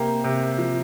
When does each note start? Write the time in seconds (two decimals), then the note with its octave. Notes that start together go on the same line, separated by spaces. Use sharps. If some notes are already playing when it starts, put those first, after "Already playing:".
Already playing: C3 A#3 G4
0.24 C3
0.58 F3